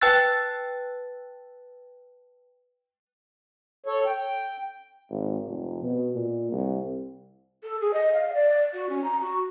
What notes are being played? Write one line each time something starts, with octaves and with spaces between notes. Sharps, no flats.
B4 G5 A5 E6 F#6 A6
A4 C#5
G5
G#1
F1
B2
A#2
C2
A4
G#4
D#5
F5
D5
F#4
C#4
A#5
F#4